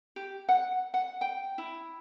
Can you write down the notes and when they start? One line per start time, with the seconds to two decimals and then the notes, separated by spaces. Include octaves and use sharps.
0.16 G4
0.49 F#5
0.94 F#5
1.21 G5
1.58 E4